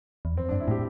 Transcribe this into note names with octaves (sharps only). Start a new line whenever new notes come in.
E2
F2 C4
D4
G2
E4
A2
G4